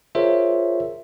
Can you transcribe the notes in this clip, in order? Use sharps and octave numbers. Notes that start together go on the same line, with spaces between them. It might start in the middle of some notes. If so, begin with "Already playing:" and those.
F4 G#4 A#4 C5 C#5 E5